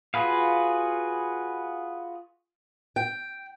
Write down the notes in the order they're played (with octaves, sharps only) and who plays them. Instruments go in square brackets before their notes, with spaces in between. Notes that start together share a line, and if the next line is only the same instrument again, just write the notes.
[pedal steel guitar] F4 F#4 G#4 B4 F5
[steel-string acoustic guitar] G5